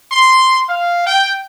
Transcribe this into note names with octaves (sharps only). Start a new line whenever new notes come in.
C6
F5
G5